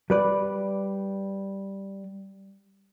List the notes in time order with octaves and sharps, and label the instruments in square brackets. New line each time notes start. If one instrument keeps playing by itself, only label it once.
[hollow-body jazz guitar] G3 B4 D5